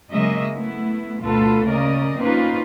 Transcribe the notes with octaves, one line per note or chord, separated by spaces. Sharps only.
C#3 F#3 G#3 A#3 D#5 E5
A3 B3 E4
D2 B2 F4 A4 B4
C#3 A#3 A#4 D5 D#5
A#3 C4 C#4 D#4 F4 B4